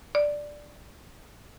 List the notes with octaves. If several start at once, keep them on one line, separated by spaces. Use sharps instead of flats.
D5